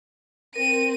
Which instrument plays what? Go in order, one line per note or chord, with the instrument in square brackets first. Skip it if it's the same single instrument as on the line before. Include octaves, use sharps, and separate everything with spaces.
[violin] C4 D#7 [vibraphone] A#4